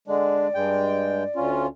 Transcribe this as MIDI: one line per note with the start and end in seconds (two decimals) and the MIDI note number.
0.08 0.48 50
0.08 0.48 56
0.08 0.48 62
0.08 1.52 74
0.55 1.24 43
0.55 1.24 56
0.55 1.24 79
1.36 1.67 38
1.36 1.67 61
1.36 1.67 65